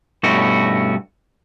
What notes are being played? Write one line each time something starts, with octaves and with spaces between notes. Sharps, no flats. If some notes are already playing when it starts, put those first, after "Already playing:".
G2 B2 A3 C#4 E4 F#4